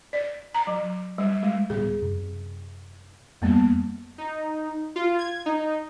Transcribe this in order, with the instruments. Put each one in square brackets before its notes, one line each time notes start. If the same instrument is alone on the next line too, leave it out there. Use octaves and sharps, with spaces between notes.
[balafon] D5
A#5
F#3
G3
G#3
[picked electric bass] D1 G3 B3 [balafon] G#4
[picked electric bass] F#2 C3
[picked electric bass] F2 [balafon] G3 A#3 B3
[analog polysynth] D#4
F4
G#6
D#4